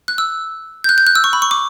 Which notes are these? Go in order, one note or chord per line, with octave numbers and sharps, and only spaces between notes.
F#6
E6
G6
F#6
G6
F#6
E6
C#6
B5
C#6
D6